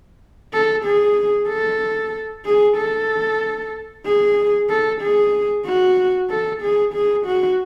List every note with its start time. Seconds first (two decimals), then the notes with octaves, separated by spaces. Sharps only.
0.53 A4
0.85 G#4
1.49 A4
2.45 G#4
2.78 A4
4.06 G#4
4.70 A4
5.02 G#4
5.65 F#4
6.30 A4
6.62 G#4
6.94 G#4
7.26 F#4